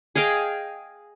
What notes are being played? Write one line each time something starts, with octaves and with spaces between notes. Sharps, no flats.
G#4 D#5 F5 G5